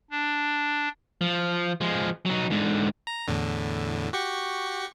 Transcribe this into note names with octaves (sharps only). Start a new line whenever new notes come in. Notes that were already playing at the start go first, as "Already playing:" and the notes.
D4
F3
F3 G#3
F#3 D#4
G#2 D3
A#5
E2 A2 D3
F#4 G4 C#6